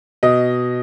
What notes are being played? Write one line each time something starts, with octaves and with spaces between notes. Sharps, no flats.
B2 D#5